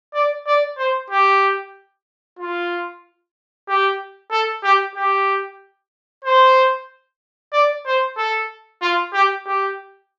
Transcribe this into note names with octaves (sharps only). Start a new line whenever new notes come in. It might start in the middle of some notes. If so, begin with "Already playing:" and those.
D5
D5
C5
G4
F4
G4
A4
G4
G4
C5
D5
C5
A4
F4
G4
G4